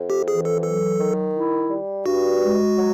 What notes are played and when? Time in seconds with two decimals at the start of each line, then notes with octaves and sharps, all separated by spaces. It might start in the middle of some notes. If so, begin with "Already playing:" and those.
Already playing: F2
0.10 G4
0.27 E3 G#4
0.45 A4
0.63 F#3 A4
0.99 D#3
1.34 E4
1.70 G3
2.06 G2 F#4
2.42 G#3
2.77 F#3